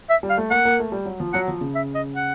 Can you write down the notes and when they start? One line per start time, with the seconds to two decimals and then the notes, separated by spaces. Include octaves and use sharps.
0.10 E5
0.23 G3
0.30 F5
0.38 A3
0.51 A#3 F#5
0.65 A#3
0.79 A3
0.92 G3
1.05 F#3
1.20 F3
1.33 F#3 F#5
1.48 F3
1.61 C#3
1.75 E5
1.95 D#5
2.16 F#5